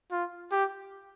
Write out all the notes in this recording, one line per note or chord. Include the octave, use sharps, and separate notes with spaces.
F4
G4